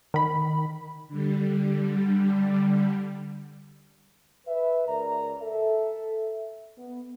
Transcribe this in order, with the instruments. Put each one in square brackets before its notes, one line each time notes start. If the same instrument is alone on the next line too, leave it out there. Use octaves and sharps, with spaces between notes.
[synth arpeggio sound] D#3 B5
[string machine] D3 G3
[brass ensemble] B4 E5
C#2 A#4 D5 A#5
A4 E5
B3